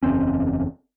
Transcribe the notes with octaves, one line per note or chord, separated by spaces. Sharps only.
F#1 E2 C4 C#4